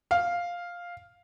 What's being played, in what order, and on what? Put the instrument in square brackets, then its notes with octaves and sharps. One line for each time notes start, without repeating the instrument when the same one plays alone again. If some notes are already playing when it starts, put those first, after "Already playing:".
[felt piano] F5